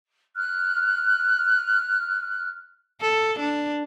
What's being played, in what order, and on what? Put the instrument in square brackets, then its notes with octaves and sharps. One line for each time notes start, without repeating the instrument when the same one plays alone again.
[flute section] F6 F#6
[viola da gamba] A4
D4